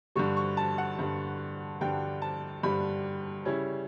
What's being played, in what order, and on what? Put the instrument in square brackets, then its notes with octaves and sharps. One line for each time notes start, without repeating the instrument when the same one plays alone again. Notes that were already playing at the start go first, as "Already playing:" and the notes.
[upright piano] G2 D3 G3 C#6
C#6
A5
F#5
G2 D3 G3
G2 D3 G3 G5
A5
G2 D3 G3 B5
C#3 G3 C#4 E4